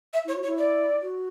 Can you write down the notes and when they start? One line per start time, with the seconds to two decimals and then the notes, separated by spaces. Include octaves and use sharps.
0.13 E5
0.25 E4
0.28 C#5
0.36 F#4
0.43 C#5
0.47 E4
0.58 D5
1.02 F#4